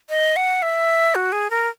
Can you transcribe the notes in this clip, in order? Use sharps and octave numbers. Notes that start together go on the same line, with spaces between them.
D#5
F#5
E5
F#4
G#4
A#4